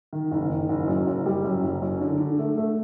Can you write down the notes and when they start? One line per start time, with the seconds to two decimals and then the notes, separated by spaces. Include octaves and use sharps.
0.13 D#3
0.32 F#1
0.50 D#3
0.69 F#1
0.88 F#2
1.07 F#1
1.26 G3
1.44 F#2
1.63 F#1
1.82 F#2
2.01 D3
2.20 D3
2.39 A3
2.57 A3